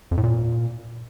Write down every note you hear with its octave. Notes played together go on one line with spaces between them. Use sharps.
F2
A2
A#2